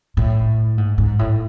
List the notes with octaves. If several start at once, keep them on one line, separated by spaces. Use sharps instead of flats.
A2
G#2
G#2
A2